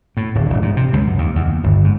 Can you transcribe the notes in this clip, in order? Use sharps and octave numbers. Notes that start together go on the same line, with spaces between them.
A2
D1
E1
G#2
C3
C#2
F#2
D#2
E2
D#2
G1
G#2